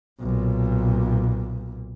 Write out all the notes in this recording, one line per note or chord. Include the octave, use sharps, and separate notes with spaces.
B1 A#2